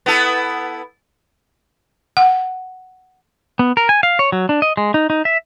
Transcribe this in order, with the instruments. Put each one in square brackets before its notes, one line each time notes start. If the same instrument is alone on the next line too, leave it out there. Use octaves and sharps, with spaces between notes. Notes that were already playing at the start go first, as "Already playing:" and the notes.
[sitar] B3 E4 A4
[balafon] F#5
[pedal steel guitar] B3
A#4
G#5
F5
C#5
F#3
D4
D#5
G#3
D#4
D#4
E5